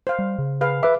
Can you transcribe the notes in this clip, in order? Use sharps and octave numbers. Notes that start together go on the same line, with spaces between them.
C5 F5
G3
C#3
G#4 B4 F5
B4 E5 D6